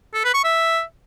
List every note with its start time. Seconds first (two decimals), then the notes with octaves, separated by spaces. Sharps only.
0.14 A4
0.24 B4
0.34 C#6
0.44 E5